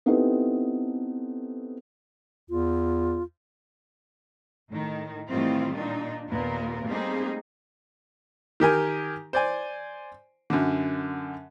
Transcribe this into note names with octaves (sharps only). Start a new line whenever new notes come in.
B3 C4 D#4 E4 G4 A4
E2 F4
A2 D#3
A2 D#3 E3 G3 C4 F4
A#2 D4 D#4
D#2 A#2 B3 A#4
G3 A3 A#3 C4 D#4 G#4
D#3 G4 A#4 G#5
C5 D5 G#5
F#2 D3